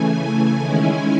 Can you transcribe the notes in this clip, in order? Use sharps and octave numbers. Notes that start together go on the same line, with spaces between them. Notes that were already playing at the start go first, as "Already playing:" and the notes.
Already playing: C#3 E3 A3 G#5
D#3 G#3 C#4 E4